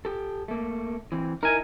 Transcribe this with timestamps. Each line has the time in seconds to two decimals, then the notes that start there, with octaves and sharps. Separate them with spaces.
0.05 G4 A4
0.48 A3 A#3
1.12 E3 C4
1.43 D#4 E4 A#4 G#5